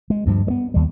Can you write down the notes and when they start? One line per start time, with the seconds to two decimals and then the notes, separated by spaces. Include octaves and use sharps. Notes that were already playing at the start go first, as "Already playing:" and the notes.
0.10 G#3
0.26 D2 G2 F3
0.47 G#3 B3
0.74 D#2 G3